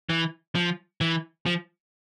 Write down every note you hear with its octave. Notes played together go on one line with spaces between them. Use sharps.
E3
F3
E3
F3